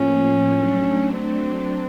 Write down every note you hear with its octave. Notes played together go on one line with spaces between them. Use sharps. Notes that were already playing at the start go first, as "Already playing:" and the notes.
Already playing: A2 F3 A#3 C#4
F#3 A3 D4
C4